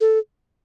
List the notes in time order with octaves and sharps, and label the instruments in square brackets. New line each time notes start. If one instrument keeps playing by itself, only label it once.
[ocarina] A4